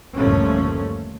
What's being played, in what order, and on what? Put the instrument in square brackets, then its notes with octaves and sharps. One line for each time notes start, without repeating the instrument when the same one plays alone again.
[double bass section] G1 D#2 A#2 F3 A3 C#4